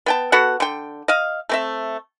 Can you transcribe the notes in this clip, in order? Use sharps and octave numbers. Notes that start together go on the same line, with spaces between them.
B3 G5 A5
B3 F#4 A4 F#5
D3 G5
D#5 F5
A3 C4 E5